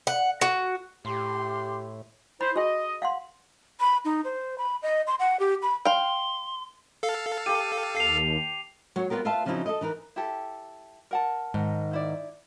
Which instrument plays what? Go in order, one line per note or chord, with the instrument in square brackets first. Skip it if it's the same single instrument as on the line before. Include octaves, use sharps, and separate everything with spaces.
[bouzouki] F#5
F#4
[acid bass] A2 [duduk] G4 [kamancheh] C6
[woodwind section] E4 C5 [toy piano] B5
[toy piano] F#4 G#4 [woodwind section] D#5
[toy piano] F5 F#5 C6
[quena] B5
D#4
C5
B5
D#5
C6
F#5
G4
B5
[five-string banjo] F5 G5 [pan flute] C6
[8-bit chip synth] A4 F5
[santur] G4 A5 [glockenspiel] D#7
[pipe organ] D#2 [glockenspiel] C7 F7
[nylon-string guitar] F#3 C#5
G3 B3 F4 G4 A#4
F4 B4 E5 F5 A5
C#3 F3 F#3 C4 D#4 E4
A4 D#5
E3 D#4 A#4 B4
[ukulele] E4 G4 A4
A#4 F#5 A5
[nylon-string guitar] G#2 D#3
[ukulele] D#4 E4 D5